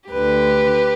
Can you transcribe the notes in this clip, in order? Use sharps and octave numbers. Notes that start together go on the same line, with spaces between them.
D2 D3 G4 B4